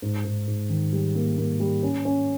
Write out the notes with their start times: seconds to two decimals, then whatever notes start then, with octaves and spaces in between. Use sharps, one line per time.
0.02 G#2
0.25 G#2
0.48 G#2
0.70 D#3
0.93 G3
1.15 A#3
1.38 A#3
1.60 G3
1.83 C#4
2.05 C#4